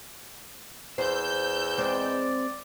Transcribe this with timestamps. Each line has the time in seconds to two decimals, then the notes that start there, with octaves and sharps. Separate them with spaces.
0.98 E2 C5 E6 G6
1.78 G#3 C4 C5 D5